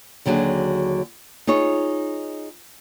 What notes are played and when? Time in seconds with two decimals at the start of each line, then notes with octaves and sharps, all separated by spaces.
0.26 D#2 D3 F#3 F#4 G#4
1.47 D#4 F4 G#4 C#5